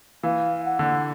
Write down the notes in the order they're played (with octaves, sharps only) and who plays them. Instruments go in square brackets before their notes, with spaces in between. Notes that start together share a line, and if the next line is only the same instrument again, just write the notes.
[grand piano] E3 [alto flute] F5
[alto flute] F#5
[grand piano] D3